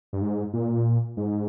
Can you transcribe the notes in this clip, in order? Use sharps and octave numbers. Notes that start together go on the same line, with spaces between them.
G2
G#2
A#2
G#2